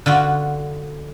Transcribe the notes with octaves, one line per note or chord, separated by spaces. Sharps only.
D3 F4 F#4